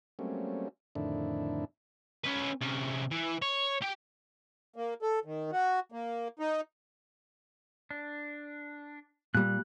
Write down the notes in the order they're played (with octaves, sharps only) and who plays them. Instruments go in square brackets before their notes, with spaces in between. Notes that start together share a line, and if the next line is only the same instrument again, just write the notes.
[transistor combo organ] F#3 G3 A3 A#3 C4 C#4
F2 A2 D3 D#3 D4 E4
[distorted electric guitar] C#4 B4
C3 C#4
E3
C#5
G4 G5
[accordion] A#3
A4
D#3
F#4
A#3
D#4
[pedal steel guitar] D4
[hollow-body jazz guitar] A#2 G3 [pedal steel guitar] F#6